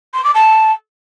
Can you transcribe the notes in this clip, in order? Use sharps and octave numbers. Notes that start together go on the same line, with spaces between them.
C6
D6
A5